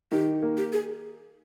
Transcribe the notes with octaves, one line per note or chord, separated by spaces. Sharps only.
D#3 G4
A#3
G4
G#4